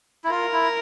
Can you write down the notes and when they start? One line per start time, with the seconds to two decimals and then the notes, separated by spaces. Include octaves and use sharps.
0.24 E4
0.30 F4 A#4
0.53 E4